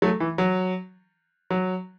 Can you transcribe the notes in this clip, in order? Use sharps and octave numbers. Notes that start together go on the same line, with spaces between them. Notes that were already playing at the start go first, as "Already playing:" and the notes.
F#3 A3
E3
F#3
F#3